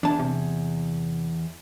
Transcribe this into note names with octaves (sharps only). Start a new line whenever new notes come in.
E2 D4 A5
C3